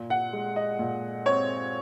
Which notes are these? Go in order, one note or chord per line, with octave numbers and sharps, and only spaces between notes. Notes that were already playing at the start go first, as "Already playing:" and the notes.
Already playing: A#2
F#5
G#3
D#5
A#2
C4 C#5